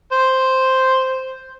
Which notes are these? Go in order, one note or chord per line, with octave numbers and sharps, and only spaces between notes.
C5